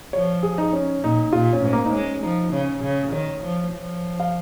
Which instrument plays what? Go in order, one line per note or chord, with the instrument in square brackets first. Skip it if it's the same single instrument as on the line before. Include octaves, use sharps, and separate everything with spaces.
[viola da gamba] F3 [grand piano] C#5
[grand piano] G#4
D#4
C#4
[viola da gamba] A#2 [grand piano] D#4
[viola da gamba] A#2 [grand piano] F4
[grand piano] C#4
[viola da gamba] G#2
[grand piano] A#3
D#4
[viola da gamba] G#3 [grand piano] C#4
[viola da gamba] F3 [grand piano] D#4
[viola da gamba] C#3 [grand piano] C#4
[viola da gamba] C#3
[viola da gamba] D#3 [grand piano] C#5
[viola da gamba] F3
F3
[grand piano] F5